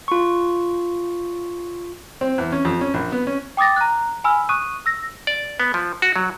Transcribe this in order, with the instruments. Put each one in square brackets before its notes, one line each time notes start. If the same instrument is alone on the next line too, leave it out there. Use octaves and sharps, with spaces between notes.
[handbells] F4 C#6
[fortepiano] C4
E2
C#4
F2
C#4
A#1
B3
C#4
[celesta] G5 D6 D#6 A6 A#6
A#5 F#6
G#5 B5 E6 F6
C#6 D#6 F#6 D#7
E6 A#6
[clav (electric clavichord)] D5
B3
F3
F#4
F#3